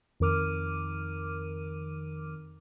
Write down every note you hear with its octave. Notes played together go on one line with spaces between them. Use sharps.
F2 D#3 A#4 D6 F6 D#7